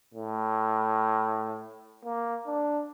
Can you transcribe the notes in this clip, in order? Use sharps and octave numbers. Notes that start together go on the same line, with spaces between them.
A2
A#3
D4